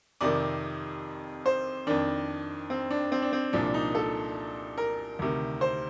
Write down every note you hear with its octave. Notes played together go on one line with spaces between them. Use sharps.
F2 C3 D#3 D5
C5
F2 D#3 D4
C4
D4
C4
D4
C4
C2 A#2 F3 D4
D#4
A4
A#4
D2 C3 D#3
C5